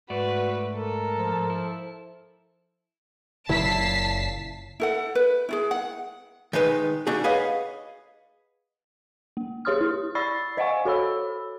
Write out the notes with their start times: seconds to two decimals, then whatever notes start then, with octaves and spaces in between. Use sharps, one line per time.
0.10 G#2 A3 F#4 B4 D5
0.76 A4 A#4
1.17 F3
1.50 E4
3.49 F#1 A#2 C#3 E4 A5 B6 C7
4.80 E4 A4 F#5
5.15 B4
5.49 E4 F4 G#4
5.71 F#5
6.53 D#3 G#3 D#4 B4
7.07 A3 D4 D#4 F#4 G#4
7.24 G#4 B4 C#5 D#5 F5 F#5
9.37 A#3
9.65 G4 G#4 C#5 C6 D#6 F6
9.81 E4
10.15 D5 B5 C#6 E6 A6 C7
10.57 C5 D#5 F5 F#5 G#5 C#6
10.85 F#4 A4 C#5 B5 E6